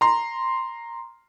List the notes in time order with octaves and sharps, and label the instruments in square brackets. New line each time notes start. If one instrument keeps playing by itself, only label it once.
[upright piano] A#5 C6